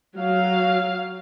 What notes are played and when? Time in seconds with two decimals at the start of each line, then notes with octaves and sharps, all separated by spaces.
0.17 F#3 F5